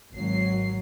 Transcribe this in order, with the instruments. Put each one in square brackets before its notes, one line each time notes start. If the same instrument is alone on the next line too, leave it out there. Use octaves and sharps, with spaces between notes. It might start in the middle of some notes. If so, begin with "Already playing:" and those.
[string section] G#1 F#3 C7